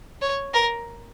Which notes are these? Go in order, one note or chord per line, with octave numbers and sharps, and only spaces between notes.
C#5
A#4